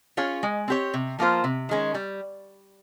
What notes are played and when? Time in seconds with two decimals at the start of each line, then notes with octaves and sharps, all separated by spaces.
0.17 C#4 F4 G#4 C#5
0.43 G#3
0.68 C4 G4 C#5
0.94 C3
1.19 F3 A#3 F4 C5
1.44 C3
1.69 D#3 G#3 C#4
1.94 G3